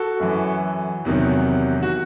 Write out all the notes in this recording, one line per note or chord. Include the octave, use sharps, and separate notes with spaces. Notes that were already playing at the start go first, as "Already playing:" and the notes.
Already playing: F#4 A4
F#2 E3
E2 C3 D#3 F#3
F#4